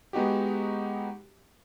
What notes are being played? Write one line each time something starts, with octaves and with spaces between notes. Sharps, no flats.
G#3 B3 D#4 F#4 G4